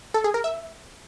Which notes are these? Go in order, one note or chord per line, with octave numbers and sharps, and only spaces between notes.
A4
G#4
A#4
E5